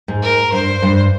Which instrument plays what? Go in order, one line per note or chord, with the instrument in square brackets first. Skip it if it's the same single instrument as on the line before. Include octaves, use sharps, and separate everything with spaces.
[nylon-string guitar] G#2
[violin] A#4
[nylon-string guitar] G2 [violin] C5
[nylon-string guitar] G2